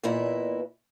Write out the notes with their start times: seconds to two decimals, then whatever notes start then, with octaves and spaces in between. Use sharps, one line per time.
0.03 E2 A#2 E3 E4 D#5